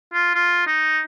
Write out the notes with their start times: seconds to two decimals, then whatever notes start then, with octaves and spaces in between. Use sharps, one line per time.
0.14 F4
0.35 F4
0.67 D#4